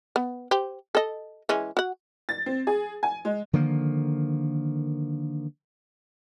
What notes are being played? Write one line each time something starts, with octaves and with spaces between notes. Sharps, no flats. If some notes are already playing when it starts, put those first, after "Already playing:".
B3
G4 C5
A4 D#5
E3 G#3 C#4
F#4 F#5
A6
C4
G#4
G#5
G#3
D3 D#3 F3 A#3